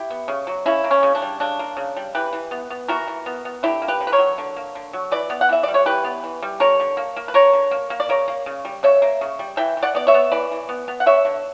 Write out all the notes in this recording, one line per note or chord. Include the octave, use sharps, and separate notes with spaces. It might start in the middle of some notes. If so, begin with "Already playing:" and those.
Already playing: E4 G4
B3
C#3
F#3
C#3 C#4 E4
A#3
C#4
C#3
D4
G3
C#3 D4
A#3
C#3
G3
E3 G4 B4
E3
B3
B3
E3 F#4 A#4
E3
B3
B3
D3 E4 G4
A#3
G4 B4
D3
B4
A#4 C#5
F#3
D3
A#3
D3
F#3
E3 B4 D5
B3
F#5
E3 E5
G3 D5
C#5
E3 G4 B4
B3
E3
G3
D3 A#4 C#5
D3
A#3
A#3
B4
D3 A#4 C#5
D3
A#3
A#3
D5
C#3 A#4 C#5
A#3
C#3
G3
C#3 C#5 E5
A#3
C#3
G3
E3 E5 G5
E3
D5 F#5
B3 D5
C#5 E5
B3
E3 B4 D5
E3
B3
B3
F#5
D3 C#5 E5
D3